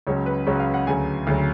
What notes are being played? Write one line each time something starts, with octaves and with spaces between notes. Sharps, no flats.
C#2 C#3 F#3 C#4 C#5
B4
C#2 C#3 F#3 C#4 C#5
F5
F#5
D2 C#3 F#3 G#5
D2 C#3 F#3